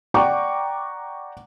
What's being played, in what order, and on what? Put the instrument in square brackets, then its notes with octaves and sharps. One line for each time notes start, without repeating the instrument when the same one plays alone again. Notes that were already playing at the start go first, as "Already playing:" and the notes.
[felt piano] D5 F#5 G5 A#5 C#6 D6